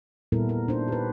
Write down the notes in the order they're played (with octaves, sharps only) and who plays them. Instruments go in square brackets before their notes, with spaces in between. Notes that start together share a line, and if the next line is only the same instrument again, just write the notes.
[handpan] A#2 G3 B3 E4 A4 A#4
A#4
D4 D#4 C5
G4 B4